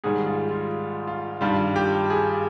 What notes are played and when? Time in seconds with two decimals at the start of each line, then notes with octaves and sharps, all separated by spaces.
0.04 G#2 D#3 G3 G#4
0.27 F4
0.50 F4
1.07 F4
1.41 G2 D#3 G3 F4
1.76 G4
2.10 G#4